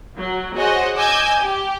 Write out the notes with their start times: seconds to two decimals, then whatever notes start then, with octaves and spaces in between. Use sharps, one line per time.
0.18 F#3
0.56 F#4 G#4 C5 C#5 D#5 F#5
0.96 D#5 G#5 D6 E6 G6 G#6
1.40 G4